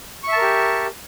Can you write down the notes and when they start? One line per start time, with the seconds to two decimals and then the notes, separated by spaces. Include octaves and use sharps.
0.23 C#6
0.28 E5
0.32 A5
0.37 A#4
0.41 G4